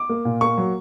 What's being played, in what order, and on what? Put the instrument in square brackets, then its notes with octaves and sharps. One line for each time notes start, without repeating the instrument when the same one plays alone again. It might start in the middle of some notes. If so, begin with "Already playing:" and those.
Already playing: [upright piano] D6
A#3
A#2
A#3 C#6
F#3